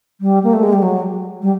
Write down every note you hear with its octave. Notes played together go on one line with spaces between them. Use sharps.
G3
A#3
A3
G#3
G3
F#3
G3